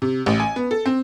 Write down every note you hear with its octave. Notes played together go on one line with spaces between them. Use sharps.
C3
A1
G#5
B3
A4
C4